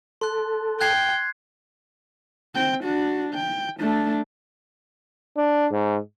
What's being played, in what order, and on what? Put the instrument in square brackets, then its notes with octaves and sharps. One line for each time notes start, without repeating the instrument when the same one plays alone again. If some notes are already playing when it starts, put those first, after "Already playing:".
[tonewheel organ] A4 [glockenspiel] C6 F#6
[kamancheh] G5 [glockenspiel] F#6 G#6 C7
[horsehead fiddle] C4 G5
D4 F#4
G5
A3 D4
[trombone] D4
G#2